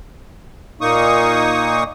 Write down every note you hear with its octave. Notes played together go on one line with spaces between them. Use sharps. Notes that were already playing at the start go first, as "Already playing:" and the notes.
A#2 A#3 D#4 C#6 D#6